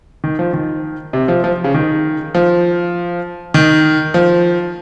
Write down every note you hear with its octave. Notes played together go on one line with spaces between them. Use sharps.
D#3
F3
D#3
C3
F3
F3
C#3
D#3
F3
D#3
F3